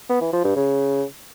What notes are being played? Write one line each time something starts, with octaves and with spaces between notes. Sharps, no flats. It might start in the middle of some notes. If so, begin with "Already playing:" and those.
B3
E3
F3
G2
C#3